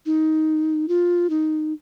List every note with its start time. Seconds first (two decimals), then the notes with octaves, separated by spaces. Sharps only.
0.06 D#4
0.88 F4
1.30 D#4